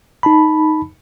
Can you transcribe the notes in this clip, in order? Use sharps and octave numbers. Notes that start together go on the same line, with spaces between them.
D#4 A5 B5